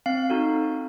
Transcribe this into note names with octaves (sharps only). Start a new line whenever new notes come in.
C4 F5
D#4 F#4 A4
C4